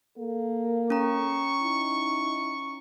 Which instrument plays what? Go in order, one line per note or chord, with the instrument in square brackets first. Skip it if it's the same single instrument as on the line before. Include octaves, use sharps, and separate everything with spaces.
[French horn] A#3 [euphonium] A4
[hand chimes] C#4 A#5 [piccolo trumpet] C#6
[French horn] D#4 [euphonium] E4